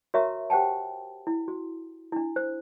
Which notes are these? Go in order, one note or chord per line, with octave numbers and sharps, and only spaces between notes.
F#4 A#4 C#5 E5 A#5 C#6
G4 C5 F#5 G5 A5
E4
F#4
D4 E4
C5